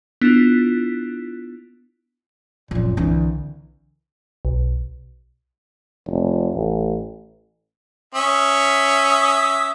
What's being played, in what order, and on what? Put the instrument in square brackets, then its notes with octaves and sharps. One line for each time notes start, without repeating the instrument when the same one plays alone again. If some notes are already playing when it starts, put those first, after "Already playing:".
[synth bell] B3 D4 E4 F4
[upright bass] F1 F#2 [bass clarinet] A#2
[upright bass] C2 D3 [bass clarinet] E3
[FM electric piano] B1
[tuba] F1
A1
[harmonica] C#4 E5 D#6